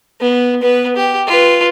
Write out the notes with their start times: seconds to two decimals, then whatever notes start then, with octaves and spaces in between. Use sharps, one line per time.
0.21 B3
0.62 B3 B4
0.96 G4
1.27 F4 B4